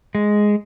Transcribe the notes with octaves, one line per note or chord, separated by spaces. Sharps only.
G#3